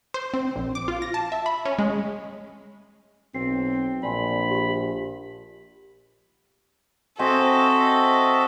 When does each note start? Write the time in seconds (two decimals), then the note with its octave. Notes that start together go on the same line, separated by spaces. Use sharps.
0.14 C5
0.34 C4
0.56 A#1
0.75 D6
0.88 F4
1.02 A#6
1.14 A5
1.32 E5
1.46 B5
1.65 C#4
1.79 G#3
3.34 B1 C4 C7
4.03 A#1 D5 G#5 B5 C6
4.50 F4 G4 E5
7.19 C4 F#4 A4 D#5 E5 G#5